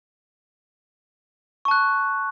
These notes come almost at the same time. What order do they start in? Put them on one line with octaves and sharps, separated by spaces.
C#6 A5 F#6